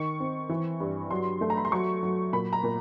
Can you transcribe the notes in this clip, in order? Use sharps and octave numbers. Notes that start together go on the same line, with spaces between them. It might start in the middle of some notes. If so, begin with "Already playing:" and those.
Already playing: D#3 C#6
C4
E3
G2
F#3 C6
A3
A#5
B5
C6
F#3 C#6
F#3
A#2 B5
A#5
A#2